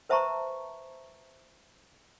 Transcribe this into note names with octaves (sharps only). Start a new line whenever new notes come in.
B4 C5 E5 A5 A#5 C#6